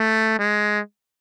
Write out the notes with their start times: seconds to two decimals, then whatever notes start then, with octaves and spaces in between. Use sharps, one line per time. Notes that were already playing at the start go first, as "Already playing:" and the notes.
Already playing: A3
0.39 G#3